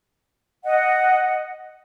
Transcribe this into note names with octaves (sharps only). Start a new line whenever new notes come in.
D#5 F#5